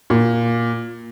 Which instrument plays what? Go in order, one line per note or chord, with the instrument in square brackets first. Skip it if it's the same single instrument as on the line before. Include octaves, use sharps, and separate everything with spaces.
[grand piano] A#2